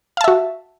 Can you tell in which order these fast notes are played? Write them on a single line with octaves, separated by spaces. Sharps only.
F5 A5 E5 F#4